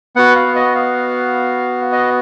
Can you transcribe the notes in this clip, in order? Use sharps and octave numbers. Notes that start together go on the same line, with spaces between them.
B3 F#4 F#5
F5
D#5
F5
D#5